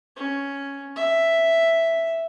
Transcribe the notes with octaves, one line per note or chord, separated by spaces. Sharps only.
C#4
E5